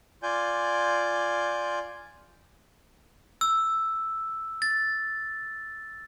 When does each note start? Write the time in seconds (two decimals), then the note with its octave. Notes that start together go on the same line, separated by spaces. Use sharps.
0.23 F4 D5 G#5 G6
3.41 E6
4.62 A6